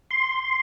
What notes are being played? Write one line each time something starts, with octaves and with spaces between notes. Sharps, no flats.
C6